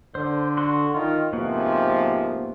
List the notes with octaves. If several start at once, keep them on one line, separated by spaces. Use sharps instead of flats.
D3 C5
F#4 C6
D#3 F4
G#2 C3 F3 A#3 B3 F#4